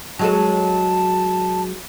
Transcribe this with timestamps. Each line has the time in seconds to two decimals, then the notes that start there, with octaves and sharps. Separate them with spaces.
0.19 F#3 G#3 A4 A5